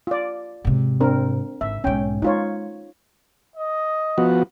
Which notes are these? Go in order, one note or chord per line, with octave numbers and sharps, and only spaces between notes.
F4 D5
G#2 C3
C4 D4 A#4
G#1 E5
B1 G#2 C#4 G5
G#3 D#4 F4 C#5
D#5
F3 B3 F#4